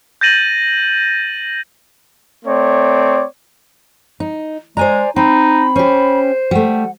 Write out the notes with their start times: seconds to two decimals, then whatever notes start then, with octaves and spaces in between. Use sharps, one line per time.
0.21 G6 A6 A#6 D#7 F#7
2.45 A3 C4 C#5 D5
4.20 D#4
4.77 G#3 C5 D5 G#5 A#5
5.16 C4 D#4 B5
5.76 C#4 G4 C5
6.51 G3 A3 F#5